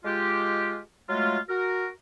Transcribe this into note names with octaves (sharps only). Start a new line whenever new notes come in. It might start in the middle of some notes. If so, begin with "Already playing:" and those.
G#3 F4 G4
F#3 G#3 A3 F4
F#4 A#4